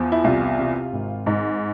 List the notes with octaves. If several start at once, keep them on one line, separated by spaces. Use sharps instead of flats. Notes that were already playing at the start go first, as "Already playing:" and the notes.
Already playing: E2 F3
E4
C2 F4
C3
G#1
G#2